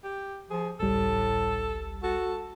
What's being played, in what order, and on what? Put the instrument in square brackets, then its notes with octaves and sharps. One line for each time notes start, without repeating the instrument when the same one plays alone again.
[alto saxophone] G4
[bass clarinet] F3 [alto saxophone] G#4
[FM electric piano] G#1 C#2 G3 [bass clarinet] A2 [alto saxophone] A4
[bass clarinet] F#4 [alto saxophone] A4